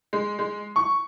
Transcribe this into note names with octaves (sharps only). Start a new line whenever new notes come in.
G#3
G#3
C#6